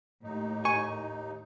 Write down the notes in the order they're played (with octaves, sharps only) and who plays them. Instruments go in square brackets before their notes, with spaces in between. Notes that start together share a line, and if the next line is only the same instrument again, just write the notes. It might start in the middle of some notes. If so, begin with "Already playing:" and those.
[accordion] D#2 D#4 [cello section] A2
[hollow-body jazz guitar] G#5 [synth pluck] C#6